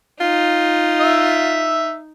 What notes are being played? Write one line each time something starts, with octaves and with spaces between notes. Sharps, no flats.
D#4 F4
E5